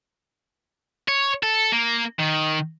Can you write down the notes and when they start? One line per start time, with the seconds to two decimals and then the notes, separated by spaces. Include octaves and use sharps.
1.08 C#5
1.43 A4
1.72 A#3
2.19 D#3